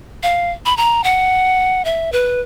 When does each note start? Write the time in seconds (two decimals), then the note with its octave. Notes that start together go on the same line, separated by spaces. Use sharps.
0.23 F5
0.66 B5
0.77 A#5
1.04 F#5
1.85 E5
2.12 B4